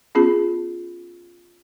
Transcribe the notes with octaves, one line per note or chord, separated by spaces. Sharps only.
B3 C#4 F4 G#4